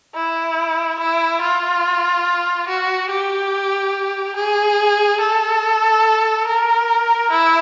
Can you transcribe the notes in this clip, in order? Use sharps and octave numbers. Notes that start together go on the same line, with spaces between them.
E4
E4
F4
F#4
G4
G#4
A4
A#4
E4